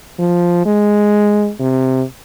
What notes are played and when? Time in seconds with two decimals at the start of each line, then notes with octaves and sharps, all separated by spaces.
0.19 F3
0.66 G#3
1.60 C3